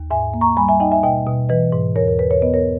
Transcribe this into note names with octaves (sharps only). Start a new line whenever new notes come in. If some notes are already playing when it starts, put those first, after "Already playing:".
Already playing: D#2
G#2 E5 G#5
A#3
A#5 C#6
G3 G#5 B5
E5 G#5
D#4 D#5 G5
E5 G#5
B2 D#5 G5
B2
E3 B4 D#5
G#2
E2 A#4 C#5
A#4
E2 B4
A#4 C#5
B3 B4 D#5
A#4 C#5